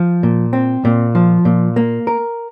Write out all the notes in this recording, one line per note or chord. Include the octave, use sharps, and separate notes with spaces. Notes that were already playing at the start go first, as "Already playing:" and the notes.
Already playing: F3
A#2
C4
A#2
F3
A#2
A#3
A#4